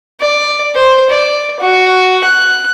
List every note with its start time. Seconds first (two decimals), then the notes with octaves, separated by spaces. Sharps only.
0.21 D5
0.75 C5
1.10 D5
1.60 F#4
2.24 F#6